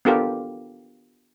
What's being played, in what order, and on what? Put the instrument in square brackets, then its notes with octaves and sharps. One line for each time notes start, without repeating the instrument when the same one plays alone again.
[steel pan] B3 D4 F4 G4 A4 A#4